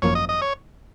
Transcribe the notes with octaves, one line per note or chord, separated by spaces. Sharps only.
G#1 F#2 F3 A#3 C#5
D#5
D#5
C#5